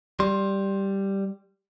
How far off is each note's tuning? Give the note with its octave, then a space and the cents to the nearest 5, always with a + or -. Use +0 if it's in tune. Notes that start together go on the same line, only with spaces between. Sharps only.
G3 +0 C6 +15